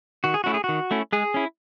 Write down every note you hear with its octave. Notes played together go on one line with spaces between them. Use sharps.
D#3 F#4
G#4
A3 C#4 E4 F#4
G#4
D#3 F#4
A3 C#4 E4
G#3 G#4
C#4 E4